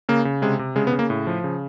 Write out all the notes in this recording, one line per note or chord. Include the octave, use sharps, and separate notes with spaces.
C#3 A#3
C#3
C3 G#3
C3
C#3 G#3
B3
C#3
A#3
A2
F3
C#3